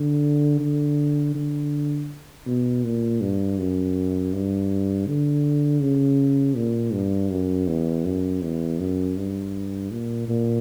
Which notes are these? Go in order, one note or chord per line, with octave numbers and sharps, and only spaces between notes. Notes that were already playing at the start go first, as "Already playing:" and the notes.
Already playing: D3
D3
D3
B2
A#2
G2
F#2
G2
D3
C#3
A#2
G2
F#2
E2
F#2
E2
F#2
G2
A#2
A#2